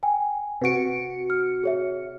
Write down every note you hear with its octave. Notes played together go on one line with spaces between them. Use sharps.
G5 G#5
C3 F#4 B4 C#7 D7
F6
G#4 C#5 E5